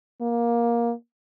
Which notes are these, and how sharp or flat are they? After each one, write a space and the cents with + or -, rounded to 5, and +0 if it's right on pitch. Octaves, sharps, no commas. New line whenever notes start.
A#3 +15